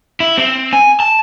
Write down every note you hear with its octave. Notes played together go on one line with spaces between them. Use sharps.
E4
C4
G#5
A5